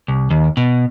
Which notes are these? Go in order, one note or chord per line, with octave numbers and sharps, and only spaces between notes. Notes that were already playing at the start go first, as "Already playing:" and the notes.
C2
D#2
B2